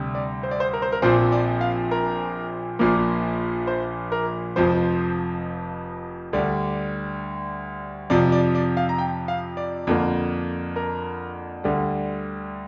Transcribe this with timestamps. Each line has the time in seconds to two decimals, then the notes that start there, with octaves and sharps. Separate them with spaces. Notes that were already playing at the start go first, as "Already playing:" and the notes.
Already playing: D2 C3 G3
0.15 D5
0.43 C5
0.51 D5
0.60 C5
0.73 A#4
0.82 C5
0.92 A#4
1.02 A#1 A#2 F3 C4 C5
1.32 D5
1.61 F5
1.91 A#4
2.79 A#1 A#2 F3 A#3
3.67 C5
4.12 A#4
4.56 F1 F2 F3 C5
6.33 D2 D3 G3 D5
8.10 F2 C3 F3 D5
8.32 D5
8.55 D5
8.77 F5
8.89 A#5
8.98 G5
9.28 F5
9.57 D5
9.87 F2 D3 A#3
10.76 A#4
11.64 D2 D3 G3